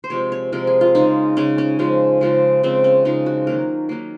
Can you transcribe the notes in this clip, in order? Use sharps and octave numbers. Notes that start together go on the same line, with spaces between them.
C5
C3 F3 G#3 C#5
C#5
C3 F3 G#3 A#4
G#4
F4
C#3 G#3 D#4
C#3 G#3 C#4
C#4
C#3 F3 G#3
C#3 F3 G#3
C#3 F3 G#3 C4
C#4
C#3 F3 G#3 D#4
F#4
D#3 F#3 A#3 A#4
D#3 F#3 A#3